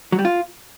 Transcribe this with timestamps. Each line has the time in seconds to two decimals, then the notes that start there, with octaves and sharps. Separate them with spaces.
0.12 F#3
0.19 G3
0.25 F4